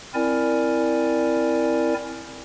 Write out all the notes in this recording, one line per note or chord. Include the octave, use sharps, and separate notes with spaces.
C4 E4 A#4 D5 G#5